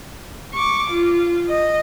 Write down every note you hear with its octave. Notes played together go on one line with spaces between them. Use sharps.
C#6 D6
F4
D#5